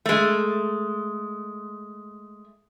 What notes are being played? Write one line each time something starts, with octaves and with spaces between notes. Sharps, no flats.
G#3 A3